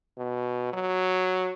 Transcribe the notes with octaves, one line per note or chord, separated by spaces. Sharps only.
B2
F#3